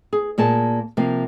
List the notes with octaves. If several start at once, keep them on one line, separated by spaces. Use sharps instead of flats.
G#4
A#2 A#3 G#4 A5
C3 F3 A#3